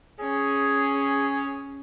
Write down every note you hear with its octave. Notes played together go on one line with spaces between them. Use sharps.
C#4 G#4